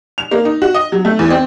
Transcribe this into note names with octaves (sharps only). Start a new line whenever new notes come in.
F7
A#3
D#4
F#4
D#5
F#3
A3
E2
C4